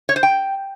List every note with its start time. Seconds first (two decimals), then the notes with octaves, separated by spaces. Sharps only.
0.09 C#5
0.16 C5
0.23 G5